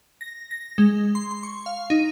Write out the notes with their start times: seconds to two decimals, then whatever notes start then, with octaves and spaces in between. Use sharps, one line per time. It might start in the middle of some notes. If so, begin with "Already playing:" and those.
0.21 A#6
0.51 A#6
0.78 G#3
1.15 C6
1.31 C6
1.43 C#6
1.66 F5
1.90 D#4